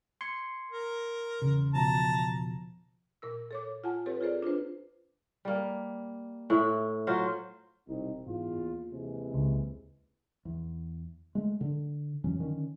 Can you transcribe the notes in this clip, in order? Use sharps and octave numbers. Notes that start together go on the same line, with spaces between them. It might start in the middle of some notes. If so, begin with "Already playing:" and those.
C6 G#6 C#7
A#4
E2 C#3
B2 F3 A5 A#5
A#2 A#4 E6
A4 C#5 D6
F4 F#5 G#5 A5
C4 G4 A4 B4 C#5
F4 G#4 A4 C5 D5
D4 F4 B4 C5
G3 A#3
A2 E4
F#3 F4 C5
E1 C2 C4 D#4
E2 G#2 F4
D#2
C3 E3 G#3
C#2
E2
G#3 A3
D3
F2 E3 F#3 C#4
D3 D#3 C#4